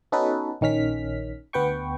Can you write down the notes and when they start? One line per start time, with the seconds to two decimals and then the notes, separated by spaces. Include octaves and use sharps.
0.12 B3 C#4 D#4 F#4 A4 B4
0.61 A#1 D#3 C#4 F6 B6
1.53 D2 B3 B4 G5 C#6